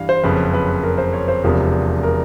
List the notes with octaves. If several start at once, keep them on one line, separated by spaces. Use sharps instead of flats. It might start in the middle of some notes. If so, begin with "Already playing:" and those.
Already playing: G2 E3 F5
C5
F#1 F2 C#3 B4
B4
A#4
C5
C#5
C5
E1 E2 C3 F3 A#4
A#4